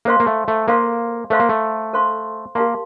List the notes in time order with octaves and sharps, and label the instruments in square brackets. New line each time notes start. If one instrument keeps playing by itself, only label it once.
[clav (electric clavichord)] A#3 [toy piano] A4 C5 F5 C6
[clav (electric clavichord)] A#3
A3
A3
[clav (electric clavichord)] A#3 [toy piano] A4 C5 F5 C6
[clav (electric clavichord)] A3 [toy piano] A4 C5 F5 C6
[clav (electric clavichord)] A#3
A3
[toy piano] A4 C5 F5 C6
[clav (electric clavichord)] A#3 [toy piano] G4 A#4 F5 A5 C6